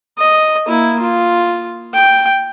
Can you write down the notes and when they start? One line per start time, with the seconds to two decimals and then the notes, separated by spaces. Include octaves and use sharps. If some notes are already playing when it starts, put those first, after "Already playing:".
0.18 D#5
0.67 A#3 E4
1.00 F4
1.94 G5